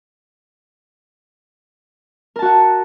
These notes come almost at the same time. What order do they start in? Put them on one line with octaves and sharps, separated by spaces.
A#4 A5 F#4 F#5